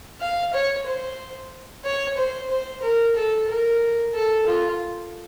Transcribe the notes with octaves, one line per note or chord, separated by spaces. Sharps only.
F5
C#5
C5
C#5
C5
C5
A#4
A4
A#4
A4
F4